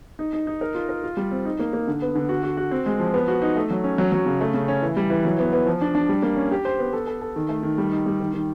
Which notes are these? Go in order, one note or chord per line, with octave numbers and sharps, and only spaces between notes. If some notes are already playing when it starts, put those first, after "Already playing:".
D#4
D#4
D#4
A#4
F4
A#4
F4
G3
C4
D#4
A#3
A#3
D3
B3
D3
F#4
F#4
F#4
C4
G#3
F3
B3
F#4
D#4
A3
F#3
C#4
F#3
F#3
C#3
A3
C#3
C#4
E3
G3
E3
F#3
B3
B3
F3
D4
D4
G3
A#3
C#4
G4
C5
B3
A4
A4
A4
D#3
A3
D#3
G3
D#4
G3
D#3
D#3